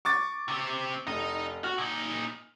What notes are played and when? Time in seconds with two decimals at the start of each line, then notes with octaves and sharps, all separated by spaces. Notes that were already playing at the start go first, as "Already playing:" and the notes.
0.05 C#6 D6 A6
0.48 C3 C4
1.07 F1 D#4 D#5
1.64 F#4 F6
1.78 A#2 D#4